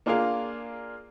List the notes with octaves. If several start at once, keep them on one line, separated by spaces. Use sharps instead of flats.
A#3 D4 F4 G#4 A#4 F5